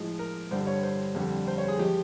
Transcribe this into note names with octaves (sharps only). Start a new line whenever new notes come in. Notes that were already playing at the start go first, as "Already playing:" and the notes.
Already playing: A2 F3 G#3
A#4
G2 D3 G3 C5
C#5
C5
F2 D3 G3
C5
C#5
G#4
F3 G#3 G4